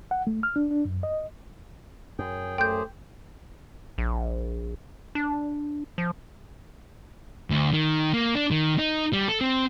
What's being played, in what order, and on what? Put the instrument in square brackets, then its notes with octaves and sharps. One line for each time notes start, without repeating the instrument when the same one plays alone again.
[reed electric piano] F#5
A3
F6
D4
D4
F#2
D#5
[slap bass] F#2 [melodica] G#4 G5
[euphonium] A3 [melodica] G4 G#4 C5 [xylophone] G5 G6
[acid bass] A#1
D4
F3
[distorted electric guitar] D2
D#3
A#3
D4
D#3
D#4
G3
A4
C4